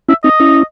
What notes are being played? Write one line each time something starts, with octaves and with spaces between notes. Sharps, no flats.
C#4 E4 E5
C4 D#4 D#5
C#4 E4